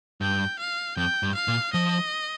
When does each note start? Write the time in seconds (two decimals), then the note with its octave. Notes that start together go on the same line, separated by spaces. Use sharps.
0.21 G2 G5
0.59 F5
0.97 F2 G5
1.23 G2
1.35 F5
1.48 A#2
1.73 F3 D#5